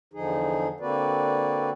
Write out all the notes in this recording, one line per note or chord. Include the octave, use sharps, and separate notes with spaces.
E2 D3 F3 D#4 G#4
D3 A#3 C4 F#4 B4 D5